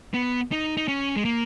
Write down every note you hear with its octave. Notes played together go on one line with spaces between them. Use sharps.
B3
D#4
D#4
C#4
G#3
A#3